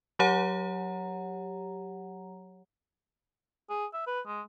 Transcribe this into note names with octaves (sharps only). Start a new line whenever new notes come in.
F#3 G4 C#5 F#5 A#5
G#4
E5
B4
G#3